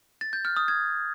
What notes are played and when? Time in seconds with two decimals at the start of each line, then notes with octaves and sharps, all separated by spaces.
0.21 A6
0.33 G6
0.45 F6
0.56 D#6
0.68 G#6